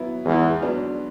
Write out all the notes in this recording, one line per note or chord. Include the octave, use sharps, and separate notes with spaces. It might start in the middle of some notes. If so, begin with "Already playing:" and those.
Already playing: F#3 B3 E4
E2 G#2
F#3 B3 D4